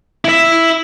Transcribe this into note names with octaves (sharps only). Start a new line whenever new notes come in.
E4 E5